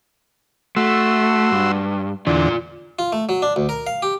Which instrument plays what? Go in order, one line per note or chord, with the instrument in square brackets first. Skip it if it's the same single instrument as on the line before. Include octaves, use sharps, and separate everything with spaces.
[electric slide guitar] A3 [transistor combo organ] F#4 C6 E6
[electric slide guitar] G2
[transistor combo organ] E2 D3 [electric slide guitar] F4 D5
[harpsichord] F4
A3
F#3
D4
D2
A#4
F5
G4